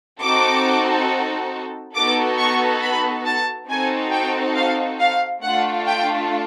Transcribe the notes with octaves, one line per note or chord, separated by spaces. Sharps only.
C4 D#4 F#4 A4 D6
B3 D#4 F#4 A4 D6
C#6
B5
A5
C4 D#4 F#4 A4 G#5
G5
F5
F5
A3 D4 F4 F#5
G5